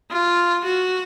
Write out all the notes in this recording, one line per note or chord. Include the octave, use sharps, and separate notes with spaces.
F4
F#4